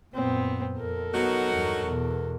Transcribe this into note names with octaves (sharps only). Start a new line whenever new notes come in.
F#2 A#2 B3 C4
F2 A4 A#4
F#3 B3 D#4 F#4
E2 G2
E2 B2